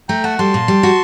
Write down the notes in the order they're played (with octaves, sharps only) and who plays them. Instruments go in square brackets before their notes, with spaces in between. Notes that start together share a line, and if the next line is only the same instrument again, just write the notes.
[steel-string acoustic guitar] A3 [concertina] G5 A#5
[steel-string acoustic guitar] F#4 [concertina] F#5 A5
[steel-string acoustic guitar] G3 [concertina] A5 C6
[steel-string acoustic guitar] A#2
G3
F#4